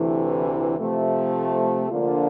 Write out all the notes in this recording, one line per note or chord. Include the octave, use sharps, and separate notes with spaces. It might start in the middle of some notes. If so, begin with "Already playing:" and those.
Already playing: D2 C3 E3 A3
C3 F3 A3
D3 F3 A#3 D4 F4